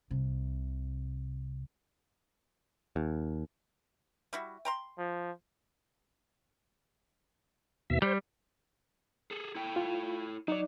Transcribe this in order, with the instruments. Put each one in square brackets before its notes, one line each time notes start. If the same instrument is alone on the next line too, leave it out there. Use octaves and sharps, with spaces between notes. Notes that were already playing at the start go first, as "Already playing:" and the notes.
[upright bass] C2 C3
[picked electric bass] D#2
[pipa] G3 E4 F#4
G5 A#5 C6
[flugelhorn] F3
[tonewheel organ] D#2 B2 E5
[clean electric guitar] G3 [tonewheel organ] C5
[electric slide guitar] G#4 A4
E4 A4 G5
[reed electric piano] F4
[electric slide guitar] F#3 [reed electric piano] D#4 D5